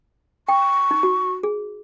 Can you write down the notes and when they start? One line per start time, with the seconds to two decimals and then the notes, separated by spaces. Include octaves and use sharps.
0.48 G5 C#6
0.91 D#4
1.03 F#4
1.43 G#4